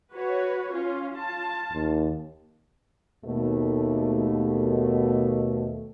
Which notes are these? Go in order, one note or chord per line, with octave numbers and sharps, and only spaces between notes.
F#4 B4 C#5
C#4 F4
F4 A5
D#2
D#2 B2 A3